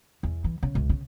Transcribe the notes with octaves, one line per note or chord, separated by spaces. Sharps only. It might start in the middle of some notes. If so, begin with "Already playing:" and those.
E2
E3
C#3
C#2
C#3